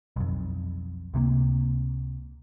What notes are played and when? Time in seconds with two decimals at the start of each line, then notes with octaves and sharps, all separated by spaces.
0.16 B1 F2
1.14 C#2 C3 A3 A#3